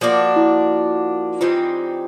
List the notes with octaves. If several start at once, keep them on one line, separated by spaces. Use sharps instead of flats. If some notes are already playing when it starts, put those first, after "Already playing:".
F3 A#3 D4 F#4
E4
E3 G3 C4 D#4 F4